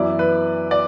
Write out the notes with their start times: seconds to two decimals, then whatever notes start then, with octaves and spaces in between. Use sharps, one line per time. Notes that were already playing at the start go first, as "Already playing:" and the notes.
Already playing: F#2 E3 B3 E4 D5
0.19 B4
0.71 D5